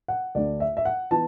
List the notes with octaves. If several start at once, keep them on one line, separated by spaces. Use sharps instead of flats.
F#5
D2 D3 A3 D4 D5
E5
E5
F#5
E3 B3 A5